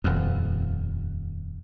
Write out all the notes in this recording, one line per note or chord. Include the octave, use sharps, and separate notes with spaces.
D#1 F2